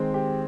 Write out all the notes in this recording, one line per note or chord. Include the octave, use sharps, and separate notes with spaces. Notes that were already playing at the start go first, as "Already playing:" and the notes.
Already playing: D#3 G#3 C4
G4